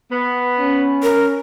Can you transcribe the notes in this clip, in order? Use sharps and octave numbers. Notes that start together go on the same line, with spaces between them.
B3
C#4
A#4